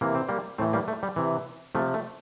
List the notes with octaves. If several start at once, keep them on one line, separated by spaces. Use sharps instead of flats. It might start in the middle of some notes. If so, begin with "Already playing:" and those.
C3 E3 A#3
C4
G3 A#3
A2 E3 A3 C4
G3 A#3
A3
G3
C3 E3
C3 F3 A3
A3